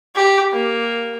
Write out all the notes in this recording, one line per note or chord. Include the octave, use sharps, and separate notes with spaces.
G4
A#3